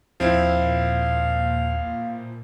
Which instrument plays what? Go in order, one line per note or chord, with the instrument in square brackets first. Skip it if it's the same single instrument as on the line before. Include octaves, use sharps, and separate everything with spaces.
[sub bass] D#2 [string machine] A#2 [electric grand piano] F3 C4 E4 [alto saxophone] F5